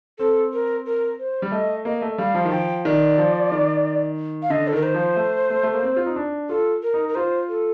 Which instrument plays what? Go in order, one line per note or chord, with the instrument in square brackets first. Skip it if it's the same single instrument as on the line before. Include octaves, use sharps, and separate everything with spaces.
[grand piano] C4 [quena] A4
[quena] A#4
A#4
C5
[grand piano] G3
[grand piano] A3 [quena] D#5
[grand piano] A#3 [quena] D#5
[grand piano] A3
[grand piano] G3 [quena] F5
[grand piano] F3
D#3
[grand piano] F3 [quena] G5
[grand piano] D#3 [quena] D5
[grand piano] F3
D#3
[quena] F5
[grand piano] D3 [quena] D#5
[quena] A4
[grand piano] D#3 [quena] A#4
[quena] C5
[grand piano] F3
A3
A3
A3
A#3
C4
F4
D#4
D4
[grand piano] F4 [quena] A4
[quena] A#4
[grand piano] D#4
[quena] A#4
[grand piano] F4 [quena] C5
[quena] A4